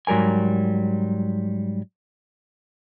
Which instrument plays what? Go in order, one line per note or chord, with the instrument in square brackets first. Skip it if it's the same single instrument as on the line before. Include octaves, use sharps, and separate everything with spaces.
[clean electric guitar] G#2 F#3 G3 A#4 G#5